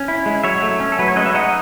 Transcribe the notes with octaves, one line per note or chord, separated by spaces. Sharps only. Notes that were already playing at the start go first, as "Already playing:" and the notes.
Already playing: C#4
E4
G#3
F#3 C#5 E5
A3
C#4
A4
F#3 B4
C#5
G#3 B4 D#5
E5
D#4 D#5 F#5